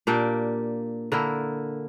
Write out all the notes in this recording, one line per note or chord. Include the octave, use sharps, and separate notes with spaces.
A#2 A#3 D4 G4
D3 A#3 E4 A#4